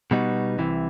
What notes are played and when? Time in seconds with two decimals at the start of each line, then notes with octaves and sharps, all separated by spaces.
0.11 B2 G3 B3 D#4 F#4
0.59 C2 C3 E3